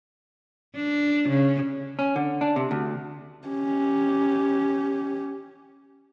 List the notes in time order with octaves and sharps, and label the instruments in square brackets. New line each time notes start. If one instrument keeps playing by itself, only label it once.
[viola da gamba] D4
C#3
[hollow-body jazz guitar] C#4
D3
D4
C3
D2
[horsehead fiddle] C#4 G4